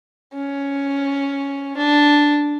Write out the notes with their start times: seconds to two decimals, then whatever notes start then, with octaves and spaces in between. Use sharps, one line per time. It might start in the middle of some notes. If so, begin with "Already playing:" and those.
0.34 C#4
1.77 D4